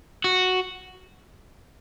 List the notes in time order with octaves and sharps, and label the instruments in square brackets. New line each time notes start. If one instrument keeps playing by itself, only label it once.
[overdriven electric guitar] F#4